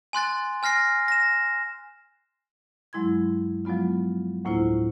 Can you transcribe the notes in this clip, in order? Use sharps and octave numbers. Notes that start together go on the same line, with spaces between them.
G#5 C6 F#6 A6
G#5 F6 A#6 C7
A#6 E7
G2 F#3 G#3 E4 C6 G#6
F3 F#3 G#3 B3 F4
D2 A2 A#3 E4 F4 C5